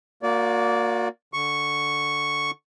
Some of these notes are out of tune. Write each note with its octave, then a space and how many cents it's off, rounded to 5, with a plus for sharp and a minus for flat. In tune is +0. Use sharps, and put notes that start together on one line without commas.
A#3 +0 F#4 -35 D5 -20
D3 +0 C#6 +0